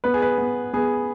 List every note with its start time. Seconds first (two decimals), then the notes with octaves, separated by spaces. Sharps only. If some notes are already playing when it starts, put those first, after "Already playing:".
0.04 B3 B4
0.14 G#4
0.22 B4
0.38 B3
0.73 B3 G#4